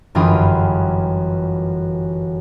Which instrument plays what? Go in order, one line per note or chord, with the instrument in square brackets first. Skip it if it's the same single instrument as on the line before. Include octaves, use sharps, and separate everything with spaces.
[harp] G1 F#2 E3 F4 G5 D#6